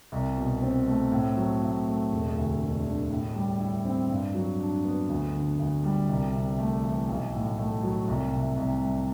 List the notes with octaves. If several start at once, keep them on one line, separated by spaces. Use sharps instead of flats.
C2
B2
C4
A3
A2
F#3
A2
A3
E1
D2
E1
D3
A2
G3
E4
C4
G2
F#3
D4
B3
D2
D3
D2
G3
C2
C3
A3
E3
B1
A2
A3
F#3
C2
C3
C2
G3